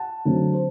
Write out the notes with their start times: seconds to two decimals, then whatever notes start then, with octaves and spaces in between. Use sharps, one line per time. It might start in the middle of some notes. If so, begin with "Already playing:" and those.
Already playing: F#5 A5
0.25 D3 F#3 A3 C4
0.54 C5